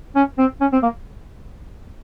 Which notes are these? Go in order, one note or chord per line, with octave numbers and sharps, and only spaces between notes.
C#4
C4
C#4
C4
A#3